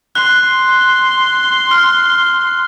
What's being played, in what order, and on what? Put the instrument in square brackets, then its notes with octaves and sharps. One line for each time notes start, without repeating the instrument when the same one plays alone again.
[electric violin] C6 [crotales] F#6
[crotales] F6